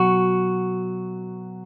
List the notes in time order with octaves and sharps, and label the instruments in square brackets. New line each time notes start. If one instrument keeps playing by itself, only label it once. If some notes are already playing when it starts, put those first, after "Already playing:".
Already playing: [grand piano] B2 F#3 [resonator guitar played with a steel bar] F#4